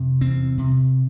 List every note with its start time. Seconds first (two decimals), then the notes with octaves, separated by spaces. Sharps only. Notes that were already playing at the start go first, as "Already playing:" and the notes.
Already playing: F2 C3
0.21 E2 C4
0.58 C3